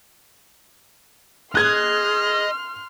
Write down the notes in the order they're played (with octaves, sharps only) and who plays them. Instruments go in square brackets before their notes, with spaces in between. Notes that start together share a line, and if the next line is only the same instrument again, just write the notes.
[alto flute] G#4 [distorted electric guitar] D#5 [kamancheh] C6 F6 [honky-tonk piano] F#6 G#6